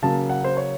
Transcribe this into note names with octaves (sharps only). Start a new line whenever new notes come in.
C#3 F#3 A#3 A5
F#5
C5
C#5